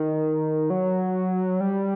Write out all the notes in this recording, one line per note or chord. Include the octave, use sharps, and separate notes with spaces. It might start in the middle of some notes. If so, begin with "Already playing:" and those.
Already playing: D#3
F#3
G3